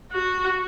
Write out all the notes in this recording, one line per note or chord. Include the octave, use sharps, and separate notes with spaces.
F#4